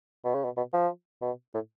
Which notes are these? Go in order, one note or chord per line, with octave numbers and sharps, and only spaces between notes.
B2
C#3
B2
B2
F3
B2
A2